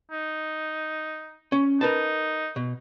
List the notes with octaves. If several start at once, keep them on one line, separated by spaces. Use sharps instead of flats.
D#4
C#4
D#4 A#4 B4 A5
B2